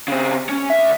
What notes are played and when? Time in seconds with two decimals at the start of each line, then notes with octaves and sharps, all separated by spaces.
0.08 C#3 C4
0.49 C#4
0.70 D2 E5